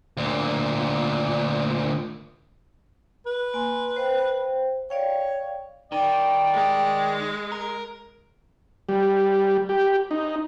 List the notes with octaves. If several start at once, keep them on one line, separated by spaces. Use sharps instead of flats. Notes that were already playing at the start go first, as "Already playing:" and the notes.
D2 A#2
B4
A#3 G#5 C6
C5 F5 G5
C#5 D5 F5 G5
D#3 D5 G5
G#3
A#4
G3
G4
D#4